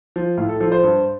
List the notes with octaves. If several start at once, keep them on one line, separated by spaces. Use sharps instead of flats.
F3
A2 F4
A4
F3 A4
C5
G2